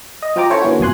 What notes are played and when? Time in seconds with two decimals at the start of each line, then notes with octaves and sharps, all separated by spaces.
0.22 D#5
0.36 F3 F4 G5 A#5 D6
0.50 C#4 E4 A4 C5 C#5 E5
0.62 D3 E3 A#3 C#4 F#4
0.79 G1 F2 B2 G#5 C6 F#6